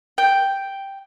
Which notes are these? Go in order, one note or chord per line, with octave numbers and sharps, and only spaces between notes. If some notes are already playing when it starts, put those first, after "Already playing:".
G5